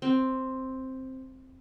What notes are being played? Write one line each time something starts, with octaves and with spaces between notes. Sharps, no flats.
C4